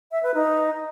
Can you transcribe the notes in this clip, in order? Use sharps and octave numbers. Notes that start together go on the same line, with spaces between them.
E5
B4
D#4